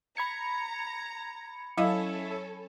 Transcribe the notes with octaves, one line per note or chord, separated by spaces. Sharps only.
A#5 B5 G#6 C#7
F#3 C#4 E4 A4 D#5 F5